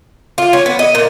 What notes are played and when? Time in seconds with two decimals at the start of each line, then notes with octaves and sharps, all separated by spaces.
0.38 F4
0.53 C#4
0.66 B3
0.79 D#5
0.95 A#2